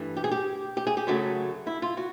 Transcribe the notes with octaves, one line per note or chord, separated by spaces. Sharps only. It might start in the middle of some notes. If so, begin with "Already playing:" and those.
Already playing: G2 E3 A3
G4
G#4
G4
G4
G#4
G4
F#2 C#3 F#3 A3 F#4
E4
F4
F#4